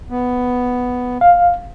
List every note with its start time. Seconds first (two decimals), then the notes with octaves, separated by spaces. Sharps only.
0.10 B3
1.21 F5